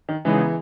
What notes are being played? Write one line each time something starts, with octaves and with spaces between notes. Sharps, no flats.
D#3
C#3 E3 G#3 B3 D#4 G#4